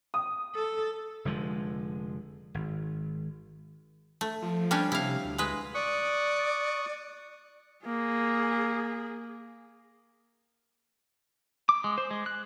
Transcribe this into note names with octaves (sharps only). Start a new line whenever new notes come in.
D#6
A4
F1 D3 F3 G#3
G#1
A3
F3
G3 C#4 D4
C3 E4 F5
D2
G#3 B4
D5 C#6 D#6 F#6
A#3 G#4
D6
G#3
C5
G#3
F#6